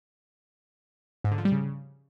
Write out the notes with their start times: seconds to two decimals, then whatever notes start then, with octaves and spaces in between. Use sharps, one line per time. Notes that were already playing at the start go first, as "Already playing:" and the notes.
1.24 G#2
1.31 D3
1.38 F3
1.45 G3
1.52 C#3